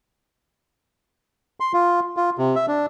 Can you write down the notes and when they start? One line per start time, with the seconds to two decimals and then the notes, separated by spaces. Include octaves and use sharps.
1.60 C6
1.73 F4
2.17 F4
2.38 C3
2.56 E5
2.68 D4